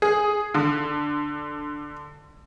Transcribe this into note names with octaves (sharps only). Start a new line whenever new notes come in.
G#4
D3